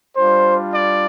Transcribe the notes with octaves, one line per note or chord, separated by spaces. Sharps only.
G3 D4 F4 C5
D5